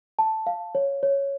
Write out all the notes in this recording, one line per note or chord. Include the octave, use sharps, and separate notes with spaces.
A5
F5
C#5
C#5